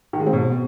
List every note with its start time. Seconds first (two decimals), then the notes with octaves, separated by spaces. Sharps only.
0.13 D#3
0.20 G#3
0.26 C4
0.33 B2